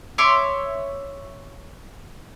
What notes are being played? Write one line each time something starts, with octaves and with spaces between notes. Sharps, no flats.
C#5 E5 C6 D6